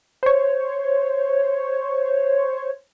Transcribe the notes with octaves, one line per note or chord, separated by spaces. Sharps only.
C5 C#5